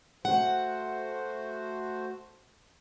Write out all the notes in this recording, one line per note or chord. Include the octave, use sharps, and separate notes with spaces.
A3 F#4 C5 F#5